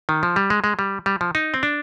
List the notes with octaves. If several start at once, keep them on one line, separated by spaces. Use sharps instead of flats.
D#3
F3
G3
G#3
G#3
G3
G3
F3
D#4
C4
D4